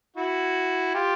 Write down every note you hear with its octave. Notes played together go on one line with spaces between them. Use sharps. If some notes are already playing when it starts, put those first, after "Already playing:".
E4 F#4
F4 G4